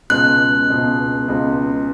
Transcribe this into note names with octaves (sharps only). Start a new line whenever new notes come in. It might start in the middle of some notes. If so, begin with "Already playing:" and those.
C#2 B2 G#3 F#6
C#2 B2 G#3
C#2 B2 G#3